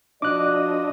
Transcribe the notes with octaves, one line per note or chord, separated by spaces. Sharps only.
F3 D4 F#4 D5 D#5 D6 F#6